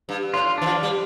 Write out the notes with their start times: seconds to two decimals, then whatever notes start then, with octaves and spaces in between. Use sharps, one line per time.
0.09 G2
0.34 A2 F4
0.58 E3 D4
0.66 F3
0.83 G3